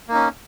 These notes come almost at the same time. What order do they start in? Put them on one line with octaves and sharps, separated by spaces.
A#3 D#4 C#4